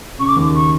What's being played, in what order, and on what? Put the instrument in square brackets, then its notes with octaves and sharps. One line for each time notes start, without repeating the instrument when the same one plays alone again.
[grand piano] C#3 [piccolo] C#6
[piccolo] D6
[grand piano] D#2
[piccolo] C#6